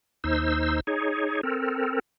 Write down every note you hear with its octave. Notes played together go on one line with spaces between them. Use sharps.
D#2 D#4 C5 E6
D#4 G#4 C#5
C4 A4 A#4